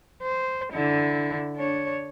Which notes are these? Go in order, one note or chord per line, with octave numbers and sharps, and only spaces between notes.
C5
D3 E4
D4 C#5